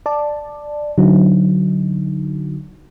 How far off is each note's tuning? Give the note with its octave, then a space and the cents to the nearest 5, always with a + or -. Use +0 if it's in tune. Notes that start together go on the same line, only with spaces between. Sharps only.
D5 +10 A5 +0
D3 +0 F#3 +0 D#4 +0